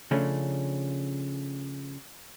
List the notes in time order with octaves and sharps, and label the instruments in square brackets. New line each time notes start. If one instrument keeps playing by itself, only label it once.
[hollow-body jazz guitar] C#3 F3 A3 C#4 D4